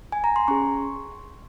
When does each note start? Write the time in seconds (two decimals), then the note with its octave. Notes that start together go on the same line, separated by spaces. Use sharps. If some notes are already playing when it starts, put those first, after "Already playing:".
0.12 G#5
0.24 A#5
0.36 C6
0.48 C#4 G#4 C#6